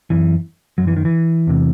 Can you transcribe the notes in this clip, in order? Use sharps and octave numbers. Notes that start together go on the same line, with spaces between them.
F#2 E3
F#2 F#3
E3
D#3
E3
E2 C3